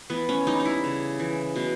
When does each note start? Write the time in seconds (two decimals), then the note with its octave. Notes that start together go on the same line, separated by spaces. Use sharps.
0.10 E3 B3
0.29 C#4
0.47 G3 D#4
0.60 D#4
0.65 E4
0.84 C#3
1.19 E3
1.56 B2